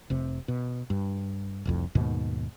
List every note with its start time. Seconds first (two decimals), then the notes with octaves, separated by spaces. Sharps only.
0.10 F1 C3
0.48 B2
0.90 G2
1.65 F1 C2 F2
1.95 D#2 G#2 B2 D#3